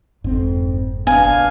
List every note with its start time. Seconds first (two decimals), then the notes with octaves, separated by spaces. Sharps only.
0.24 F#1 F2 G#2 C4
1.07 A#1 B3 D4 F5 G#5